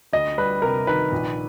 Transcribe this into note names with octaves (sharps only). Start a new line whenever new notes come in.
D2 D#5
G3 B4
C3 A#4
D#3 B4
A#1